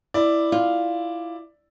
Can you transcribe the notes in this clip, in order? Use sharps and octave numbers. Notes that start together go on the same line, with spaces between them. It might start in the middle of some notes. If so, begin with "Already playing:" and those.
E4 D5
F4